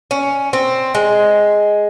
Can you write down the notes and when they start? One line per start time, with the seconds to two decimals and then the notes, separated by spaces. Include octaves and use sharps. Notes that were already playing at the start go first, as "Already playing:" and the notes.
0.11 C#4
0.53 C4
0.95 G#3